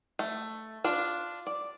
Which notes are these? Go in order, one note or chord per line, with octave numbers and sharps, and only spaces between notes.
A3
D4 F4
D5